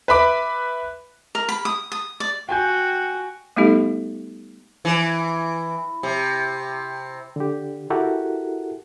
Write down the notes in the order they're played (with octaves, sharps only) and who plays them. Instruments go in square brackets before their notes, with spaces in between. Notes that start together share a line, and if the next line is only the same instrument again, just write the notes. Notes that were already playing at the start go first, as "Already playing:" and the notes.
[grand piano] B4 E5 B5 D6
[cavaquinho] A#4
B5
D#6
D#6
D5
[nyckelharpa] F#4 [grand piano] G5 G#5 G6
[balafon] G3 A3 B3 D#4 G4 A4
[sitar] E3
C3
[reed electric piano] D3 G4
E4 F#4 G4 A4 A#4 F#5